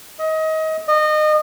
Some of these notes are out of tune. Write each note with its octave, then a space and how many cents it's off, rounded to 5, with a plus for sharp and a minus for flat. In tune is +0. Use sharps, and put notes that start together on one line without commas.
D#5 +25
D#5 -25